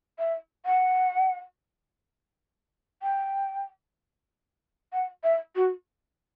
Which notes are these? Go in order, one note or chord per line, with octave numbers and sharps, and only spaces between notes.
E5
F#5
G5
F#5
E5
F#4